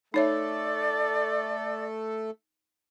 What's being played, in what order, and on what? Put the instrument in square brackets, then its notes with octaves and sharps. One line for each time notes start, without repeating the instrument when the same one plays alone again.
[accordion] A3 A4 [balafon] D#4 C#5 E5 [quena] D5